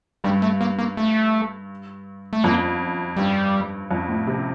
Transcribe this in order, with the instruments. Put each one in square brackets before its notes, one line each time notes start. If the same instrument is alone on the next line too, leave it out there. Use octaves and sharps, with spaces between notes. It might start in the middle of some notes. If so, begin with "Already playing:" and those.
[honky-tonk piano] G2 [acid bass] G3
[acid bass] A3
A#3
A#3
A3
A3
[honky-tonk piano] F2 [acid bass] A#3
[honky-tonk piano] G2 [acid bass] G3
[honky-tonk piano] F2
A2
C3